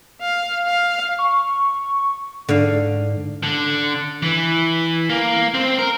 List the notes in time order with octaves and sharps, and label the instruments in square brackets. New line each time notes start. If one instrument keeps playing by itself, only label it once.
[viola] F5
F5
[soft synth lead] C#6
[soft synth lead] G#2 [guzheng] D3 F5
[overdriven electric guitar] D3
E3
A#3
C4
A#4